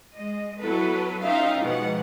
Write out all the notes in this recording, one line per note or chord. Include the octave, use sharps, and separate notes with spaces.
G#3 D#5
F#3 B3 E4 A4 B4
C#4 D#4 F4 E5 F5 G5
G#2 B2 F3 G#3 F#5